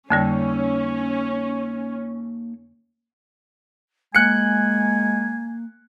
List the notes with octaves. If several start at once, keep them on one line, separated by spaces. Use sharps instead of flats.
F2 D3 G3 A#3 C#4 D#4 A4
G#3 A#3 G#5 F#6 C#7